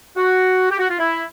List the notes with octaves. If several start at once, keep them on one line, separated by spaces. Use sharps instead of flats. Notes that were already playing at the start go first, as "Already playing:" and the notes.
F#4
G4
F#4
F4
E4